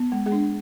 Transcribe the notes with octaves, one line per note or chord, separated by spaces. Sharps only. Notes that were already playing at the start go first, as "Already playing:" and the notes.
Already playing: B3
G#3
G#3 G#4
D4